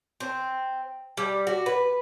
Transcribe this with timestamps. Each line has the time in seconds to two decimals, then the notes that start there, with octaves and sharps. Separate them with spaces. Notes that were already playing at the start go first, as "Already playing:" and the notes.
0.20 C4
1.17 G3
1.47 F#4
1.66 B4